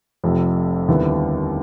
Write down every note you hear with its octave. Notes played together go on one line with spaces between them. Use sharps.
F1 F2 C3
D#2 D3 G3 B3 E4